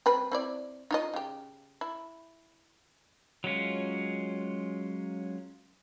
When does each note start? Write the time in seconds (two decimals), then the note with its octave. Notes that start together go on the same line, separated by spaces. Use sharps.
0.06 G3 C4 B4
0.31 C4 E4 D5
0.91 D#4 F4 D#5
1.14 C#3 G4
1.81 E4
3.44 F#3 G#3 C#4 F4